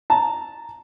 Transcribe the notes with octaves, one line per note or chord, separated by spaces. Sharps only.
A5 A#5